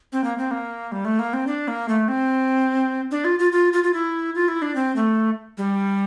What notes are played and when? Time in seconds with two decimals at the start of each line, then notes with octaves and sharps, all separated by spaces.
0.13 C4
0.24 A#3
0.38 C4
0.51 A#3
0.92 G3
1.05 A3
1.19 A#3
1.33 C4
1.47 D4
1.68 A#3
1.89 A3
2.08 C4
3.11 D4
3.25 F4
3.39 F4
3.52 F4
3.73 F4
3.84 F4
3.93 E4
4.35 F4
4.48 E4
4.62 D4
4.76 C4
4.96 A3
5.58 G3